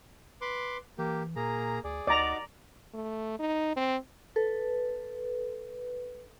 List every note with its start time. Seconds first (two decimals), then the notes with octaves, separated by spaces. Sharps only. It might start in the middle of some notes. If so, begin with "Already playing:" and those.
0.41 B4 C6 D6
0.98 E3 A#3 G4
1.36 A#2 A#3 G#4 A#5
1.84 D2 G#4 D5
2.07 D2 D#4 F#4 D5 A#5 D6
2.94 A3
3.39 D#4
3.76 C4
4.36 A4 B4